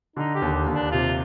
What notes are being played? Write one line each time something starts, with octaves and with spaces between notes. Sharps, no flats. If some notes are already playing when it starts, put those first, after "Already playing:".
D3 D#4
G4
D#2
D#2
D4
C3 F4